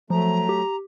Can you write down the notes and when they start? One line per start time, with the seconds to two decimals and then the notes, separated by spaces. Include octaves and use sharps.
0.10 F3 F#3 A3 A#5
0.49 G4